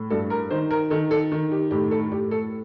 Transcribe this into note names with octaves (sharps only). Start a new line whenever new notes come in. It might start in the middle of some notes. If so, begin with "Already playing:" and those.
Already playing: A2
G2 A4
A#4
D#3 C5
A#4
D#3 A4
A4
D#3
G4
A2 G4
A4
A2 G4
A4